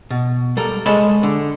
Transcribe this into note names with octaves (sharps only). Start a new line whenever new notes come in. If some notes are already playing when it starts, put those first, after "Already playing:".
B2
G3 A4 A#4
G#3 A4 C#5 D#5 A5 B5
D3